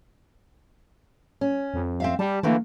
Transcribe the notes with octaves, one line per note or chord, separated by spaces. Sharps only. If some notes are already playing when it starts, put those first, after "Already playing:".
C#4
F2
C4 E5 F5
G3 A5
D3 E3 A3 A#3